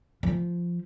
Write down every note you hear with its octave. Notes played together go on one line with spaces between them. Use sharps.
F3